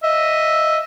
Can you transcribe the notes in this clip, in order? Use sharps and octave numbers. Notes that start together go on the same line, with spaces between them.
D#5 E5